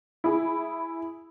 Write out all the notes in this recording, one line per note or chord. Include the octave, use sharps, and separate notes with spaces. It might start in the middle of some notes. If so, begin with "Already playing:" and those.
E4 G#4